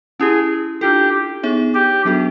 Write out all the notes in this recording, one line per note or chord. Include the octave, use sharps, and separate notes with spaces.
C#4 E4 G4 G#4
D4 F4 G4 A4
B3 D#4 G#4 C#5 E5
G4
F#3 B3 D4 F#4 A4